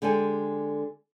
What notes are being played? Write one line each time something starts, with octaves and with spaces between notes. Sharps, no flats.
D3 G#3 G4 A4 G#5